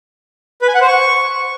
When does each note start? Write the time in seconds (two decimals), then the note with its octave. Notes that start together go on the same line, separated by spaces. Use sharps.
0.62 B4
0.68 G#5
0.75 F#5
0.81 C5
0.87 C#6